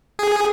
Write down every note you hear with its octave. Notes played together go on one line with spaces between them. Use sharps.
G#4